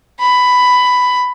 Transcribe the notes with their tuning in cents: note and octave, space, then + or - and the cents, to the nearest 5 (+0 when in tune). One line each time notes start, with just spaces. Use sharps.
B5 +10